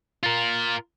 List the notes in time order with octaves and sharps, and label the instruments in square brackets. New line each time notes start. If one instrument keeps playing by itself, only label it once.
[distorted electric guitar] F4 A#4